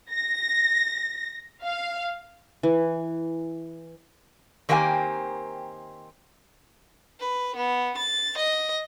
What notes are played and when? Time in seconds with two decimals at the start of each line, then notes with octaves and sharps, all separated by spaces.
0.11 A#6
1.62 F5
2.63 E3
4.69 D#3 A#3 C4 G4 E5 G#5
7.20 B4
7.56 B3
7.98 A6
8.38 D#5